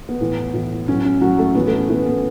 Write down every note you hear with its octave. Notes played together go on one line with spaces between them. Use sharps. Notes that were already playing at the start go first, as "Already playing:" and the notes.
B3
A2 E3
A2 E3
A2 F#3 C#4
C#4
A2 F#3 F#4
A3 A4
A2 E3 B3 B4
A3 A4
C#4
A2 E3 B3
B3